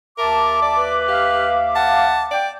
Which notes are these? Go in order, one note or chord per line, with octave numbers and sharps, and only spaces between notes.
D#2 A#4 E5 A5 D6
D5
B4
G4 F5
F#5 A5
D5 G5